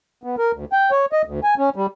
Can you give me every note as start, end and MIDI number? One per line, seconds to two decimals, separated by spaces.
0.23 0.36 59
0.38 0.52 70
0.53 0.65 38
0.73 0.91 79
0.91 1.06 73
1.13 1.22 75
1.25 1.40 38
1.44 1.55 80
1.58 1.70 61
1.76 1.86 55